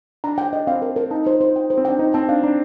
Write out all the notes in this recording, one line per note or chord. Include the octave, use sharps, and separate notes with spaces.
D4 A#5
G5
D#5
C4 F5
A#4
A#4
D#4 A5
C5
C5
G5
C5
C4
D4 G5
D#4 C5
C4 A5
D4 F5
D4 A#5